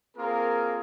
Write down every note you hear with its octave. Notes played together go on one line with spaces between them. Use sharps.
A#3 C4 F4 G#4 A#4